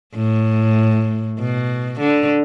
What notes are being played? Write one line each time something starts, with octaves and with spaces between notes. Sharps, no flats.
A2
B2
D3